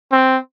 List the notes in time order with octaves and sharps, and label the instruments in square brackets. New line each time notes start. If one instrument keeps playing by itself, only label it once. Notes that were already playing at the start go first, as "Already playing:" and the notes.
[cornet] C4